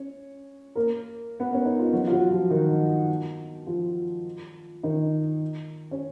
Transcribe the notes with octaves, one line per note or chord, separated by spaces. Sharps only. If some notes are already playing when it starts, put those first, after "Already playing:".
Already playing: C#4 C#5
A#3 A#4
B3
C#4
D#4
F4
F#3 F#4
F4
F#3 F#4
F3 F4
D#3 D#4
F3 F4
D#3 D#4
C#4